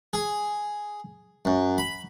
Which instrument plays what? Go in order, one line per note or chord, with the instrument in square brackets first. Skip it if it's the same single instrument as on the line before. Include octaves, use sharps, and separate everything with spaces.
[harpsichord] G#4
F#2
B5